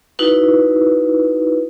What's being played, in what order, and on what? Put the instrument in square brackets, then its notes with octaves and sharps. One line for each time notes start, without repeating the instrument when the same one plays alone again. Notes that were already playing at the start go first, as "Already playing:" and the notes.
[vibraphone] D#4 E4 F#4 B4